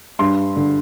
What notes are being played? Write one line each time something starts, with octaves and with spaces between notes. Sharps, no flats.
G2 C6
D3